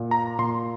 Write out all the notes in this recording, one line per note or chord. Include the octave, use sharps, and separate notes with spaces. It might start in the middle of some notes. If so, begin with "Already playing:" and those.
Already playing: A#2
A#5
A#2 C6